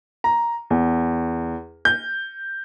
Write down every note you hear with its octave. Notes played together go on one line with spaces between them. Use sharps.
A#5
E2
G6